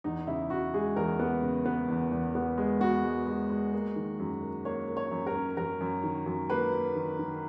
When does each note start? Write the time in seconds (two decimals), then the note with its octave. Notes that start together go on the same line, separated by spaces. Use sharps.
0.04 E2 D#4
0.27 C#3 E4
0.50 C#3 F#4
0.74 G#3 G#4
0.96 E2 A#4
1.19 B3
1.42 C#3
1.66 B3
1.89 E2
2.11 E2
2.35 B3
2.58 G#3
2.81 B3 F#4
3.04 G#3
3.27 G#3
3.50 G#3
3.73 A#3
3.96 D#3
4.19 F#2
4.43 A#3
4.65 A#3 C#5
4.88 A#3
4.97 C#5
5.11 F#2
5.27 A#4
5.35 C#4
5.57 F#2 A#4
5.81 F#2
6.04 D#3
6.26 F#2
6.50 A#3 B4
6.72 A#3
6.95 D#3
7.19 D#3